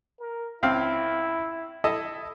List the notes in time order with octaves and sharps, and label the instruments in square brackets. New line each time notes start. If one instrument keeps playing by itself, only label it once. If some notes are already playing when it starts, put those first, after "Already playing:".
[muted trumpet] A#4
[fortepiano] C#2 C4 F5 [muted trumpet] E4
[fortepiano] E4 A4 D#5